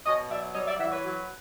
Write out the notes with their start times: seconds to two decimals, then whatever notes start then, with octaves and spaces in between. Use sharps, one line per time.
0.06 B2 C#5 D#5
0.30 F#3 D5 E5
0.55 G3 C#5 D#5
0.67 D5 E5
0.79 E3 E5 F#5
0.92 B4 C#5
1.04 F#3